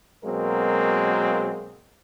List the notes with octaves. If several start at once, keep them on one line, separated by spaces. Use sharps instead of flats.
B2 F#3 G#3 A#3 C4 A#4